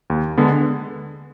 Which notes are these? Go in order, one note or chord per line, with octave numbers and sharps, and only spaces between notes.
D#2
D3 G#3 B3